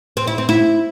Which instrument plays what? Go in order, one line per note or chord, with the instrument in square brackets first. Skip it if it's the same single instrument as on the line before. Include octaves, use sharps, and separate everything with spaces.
[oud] C4
E4
C4
E4